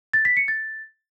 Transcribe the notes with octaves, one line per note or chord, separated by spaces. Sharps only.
A6
B6
C#7
A6